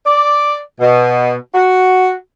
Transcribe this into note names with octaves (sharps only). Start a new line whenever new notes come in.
D5
B2
F#4